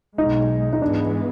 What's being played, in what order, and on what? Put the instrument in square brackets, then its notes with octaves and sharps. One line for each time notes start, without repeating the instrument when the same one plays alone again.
[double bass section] B1 B2 G#3 [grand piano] D#4
[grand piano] D#4
[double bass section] G#2 E3 G#3 B3 [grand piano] D4